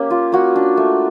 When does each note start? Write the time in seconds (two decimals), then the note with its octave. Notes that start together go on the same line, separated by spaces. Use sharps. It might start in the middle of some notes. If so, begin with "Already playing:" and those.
Already playing: A#3 C#4 G4
0.11 F4
0.32 A#3 F#4
0.56 D4
0.77 A3